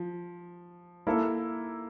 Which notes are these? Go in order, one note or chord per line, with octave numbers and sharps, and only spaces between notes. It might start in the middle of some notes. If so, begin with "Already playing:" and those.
Already playing: F3
A#3 E4 A4